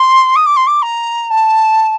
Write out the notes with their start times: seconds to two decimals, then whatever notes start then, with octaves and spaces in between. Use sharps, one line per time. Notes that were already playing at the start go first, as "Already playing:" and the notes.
Already playing: C6
0.36 D#6
0.46 D6
0.56 C6
0.67 D6
0.82 A#5
1.30 A5